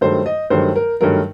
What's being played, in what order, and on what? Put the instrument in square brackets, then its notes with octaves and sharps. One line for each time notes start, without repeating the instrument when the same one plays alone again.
[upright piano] G2 D#3 F#3 A3 C5
D#5
G2 D#3 F#3 A3 C5
A#4
G2 D#3 F#3 A3 A#4